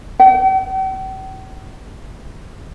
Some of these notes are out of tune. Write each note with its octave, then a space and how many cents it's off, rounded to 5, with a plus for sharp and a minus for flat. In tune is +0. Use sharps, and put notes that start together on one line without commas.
G5 -45